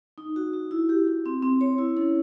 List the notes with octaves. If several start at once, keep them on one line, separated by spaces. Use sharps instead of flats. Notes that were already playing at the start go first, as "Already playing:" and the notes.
D#4
F#4
F#4
E4
G4
E4
C4
C4
C#5
E4
C#4